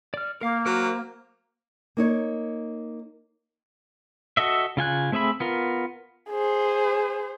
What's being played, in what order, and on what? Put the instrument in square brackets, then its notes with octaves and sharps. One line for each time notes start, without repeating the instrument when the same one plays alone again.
[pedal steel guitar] D5 F6
[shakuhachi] A#3 [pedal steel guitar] A#4 F5
[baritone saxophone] F#3 [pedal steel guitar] A#4 C5 A#5
[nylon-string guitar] A#3 D#4 C#5
[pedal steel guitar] F#4 A4 D#5 E5
C#3 F4 G#5 F#6
A3 C4 G#4 E5 B5
B3 F4 A#4
[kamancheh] G#4 C5